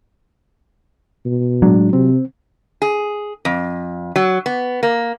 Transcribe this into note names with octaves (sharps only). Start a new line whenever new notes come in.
B2
A2 F#3 G#3 D4
C3 C4
G#4
F2
F#3
B3
A#3